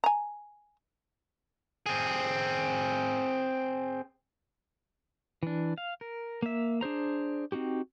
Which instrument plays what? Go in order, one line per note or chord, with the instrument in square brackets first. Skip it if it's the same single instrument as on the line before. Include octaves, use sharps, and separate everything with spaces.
[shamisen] G#5 A#5
[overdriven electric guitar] C4 G#4
[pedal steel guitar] E3 D4
F5
A#4
A#3 E5
D4 G#4 C5 A#5
C4 D#4 F#4 G4